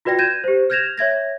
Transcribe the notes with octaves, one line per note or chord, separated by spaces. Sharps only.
F4 F#4 B4 D5 G5 A#6
G6 G#6 A#6 D#7 E7
G4 C5
F6 G6 G#6 A#6 E7 F7
C#5 E5 G#6 A#6